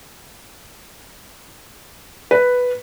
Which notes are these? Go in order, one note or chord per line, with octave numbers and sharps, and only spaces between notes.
B4